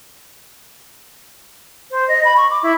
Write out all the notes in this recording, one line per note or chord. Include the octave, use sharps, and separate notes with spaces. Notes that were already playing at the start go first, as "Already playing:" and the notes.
C5
D#5
B5
C#6
D6
E4